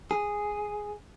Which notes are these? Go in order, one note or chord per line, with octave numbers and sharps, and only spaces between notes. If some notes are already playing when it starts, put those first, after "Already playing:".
G#4